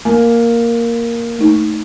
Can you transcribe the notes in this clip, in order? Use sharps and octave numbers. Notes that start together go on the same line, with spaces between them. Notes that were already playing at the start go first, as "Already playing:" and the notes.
A#3 G#5
A3 D#4